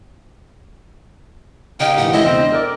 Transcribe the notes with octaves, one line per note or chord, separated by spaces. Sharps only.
C#3 A#3 D#4 G4 G5
A2 E3 F#5
C#3 F3 G#3 A3 D#4 E4 D#5
E1 C4
D4
A4 A#4 D5 G5